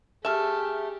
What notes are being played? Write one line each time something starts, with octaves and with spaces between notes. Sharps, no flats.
A3 G4 G#4 E5 A5 F6